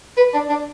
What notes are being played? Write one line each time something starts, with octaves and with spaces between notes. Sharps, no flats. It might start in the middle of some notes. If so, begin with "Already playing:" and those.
B4
D4
D4